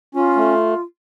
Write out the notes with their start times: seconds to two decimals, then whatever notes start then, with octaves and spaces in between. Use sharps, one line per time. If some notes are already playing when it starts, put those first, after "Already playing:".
0.15 C#4 F4
0.36 A3